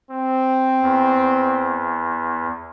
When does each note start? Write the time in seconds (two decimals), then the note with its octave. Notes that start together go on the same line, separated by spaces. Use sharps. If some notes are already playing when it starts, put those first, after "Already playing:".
0.11 C4
0.81 E2